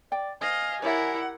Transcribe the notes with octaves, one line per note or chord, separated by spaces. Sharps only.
D5 G5
C5 D#5 F5 G#5
E4 G4 A#4 C#5 D5 E5 F#5